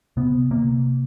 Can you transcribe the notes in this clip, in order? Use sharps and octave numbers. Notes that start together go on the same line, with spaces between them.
C3 B3
C3 A#3